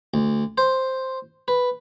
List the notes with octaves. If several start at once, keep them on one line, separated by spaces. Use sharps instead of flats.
D2
C5
B4